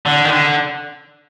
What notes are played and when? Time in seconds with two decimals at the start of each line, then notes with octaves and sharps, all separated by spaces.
0.06 D3
0.25 D#3
0.31 D3